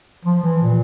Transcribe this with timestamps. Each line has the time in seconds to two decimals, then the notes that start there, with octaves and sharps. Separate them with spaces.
0.25 F3
0.43 E3
0.62 A#2